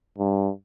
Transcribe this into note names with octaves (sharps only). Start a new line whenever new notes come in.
G2